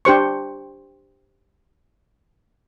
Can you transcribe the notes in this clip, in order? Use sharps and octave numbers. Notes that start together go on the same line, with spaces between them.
D4 G4 C5 C#6